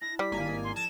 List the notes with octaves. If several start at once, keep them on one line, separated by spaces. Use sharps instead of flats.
D4 E4 A#6
G3 B6
G#1 A#3 G#5
D5 D#6
C6
F3 A4 A5 G#6 A#6 E7